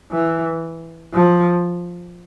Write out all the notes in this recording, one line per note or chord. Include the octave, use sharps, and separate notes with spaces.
E3
F3